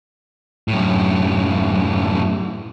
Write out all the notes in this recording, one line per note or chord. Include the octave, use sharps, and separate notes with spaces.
F#2 A2